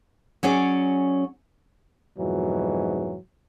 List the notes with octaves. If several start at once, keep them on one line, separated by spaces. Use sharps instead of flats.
F#3 C#4 G#4 D5
F2 G#2 B2 E3 F#3